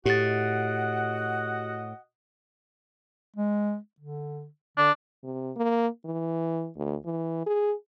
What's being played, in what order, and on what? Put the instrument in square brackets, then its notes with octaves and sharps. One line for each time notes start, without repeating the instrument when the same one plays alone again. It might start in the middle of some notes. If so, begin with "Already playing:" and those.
[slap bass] A2 [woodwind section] F#4 D#5 F#5 [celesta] G4 A6
[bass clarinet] G#3
D3
[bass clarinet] D3 [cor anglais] D4
[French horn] C3
A#3
E3
D2
E3
G#4